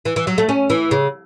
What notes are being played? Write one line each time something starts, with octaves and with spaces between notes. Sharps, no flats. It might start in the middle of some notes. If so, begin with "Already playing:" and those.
E3
E3
F#3
A3
C#4
E3
C#3